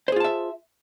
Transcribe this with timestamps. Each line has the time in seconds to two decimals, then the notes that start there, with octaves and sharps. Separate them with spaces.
0.08 C5
0.12 G#4
0.16 F4
0.20 A5
0.24 E5